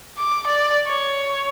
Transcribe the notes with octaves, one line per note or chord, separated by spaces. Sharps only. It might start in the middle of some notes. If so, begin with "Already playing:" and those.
D6
D5
C#5